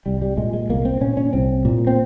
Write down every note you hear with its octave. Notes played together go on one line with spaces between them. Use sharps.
C2 G3
G3
A#2 G#3
G#3
C2 A#3
C4
A#2 C#4
C#4
C2 C4
A#2
C4